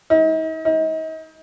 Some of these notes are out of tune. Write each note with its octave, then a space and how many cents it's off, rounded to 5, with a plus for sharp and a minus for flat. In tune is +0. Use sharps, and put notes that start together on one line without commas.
D#4 +40
D#4 +35